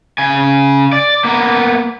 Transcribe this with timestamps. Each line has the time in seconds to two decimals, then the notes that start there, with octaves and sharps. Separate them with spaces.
0.18 C#3 G#5
0.93 D5
1.25 A#3 B3